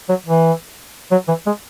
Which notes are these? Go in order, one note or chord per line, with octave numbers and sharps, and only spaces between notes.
F#3
E3
F#3
E3
G#3